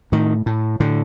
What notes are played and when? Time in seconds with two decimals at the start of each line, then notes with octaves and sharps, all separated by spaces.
0.12 A2 D#3
0.46 A2
0.80 A2 D3